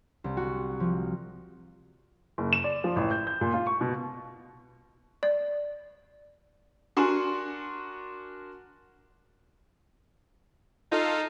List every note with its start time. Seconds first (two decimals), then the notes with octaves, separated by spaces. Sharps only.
0.24 C2
0.37 F#4
0.80 F3
2.38 F#1
2.53 E7
2.64 D5
2.84 F3
2.96 A1
3.11 G6
3.27 G6
3.41 A#2
3.54 F4
3.67 C#6
3.81 B2
5.23 D5
6.97 D4 F#4 A#4 G#5 C6 C#6
10.92 D#4 F4 A4 F5